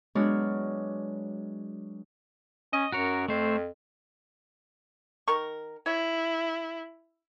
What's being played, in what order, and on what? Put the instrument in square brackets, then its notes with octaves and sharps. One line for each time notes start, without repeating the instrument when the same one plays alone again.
[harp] F#3 G#3 B3 D4 C#5 F6
[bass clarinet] C#4 [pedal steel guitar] D#5
[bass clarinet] F#2 [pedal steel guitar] F#4 A#4 C#5
[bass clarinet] F2 [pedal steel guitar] A3 C5
[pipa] D#3 A#4 C#6
[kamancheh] E4 [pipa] C#5